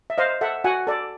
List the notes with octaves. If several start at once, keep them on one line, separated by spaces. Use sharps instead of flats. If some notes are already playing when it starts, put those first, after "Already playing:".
E5
C5 D#5 F5
A4 E5 F#5
F#4 F#5 G#5
A4 D5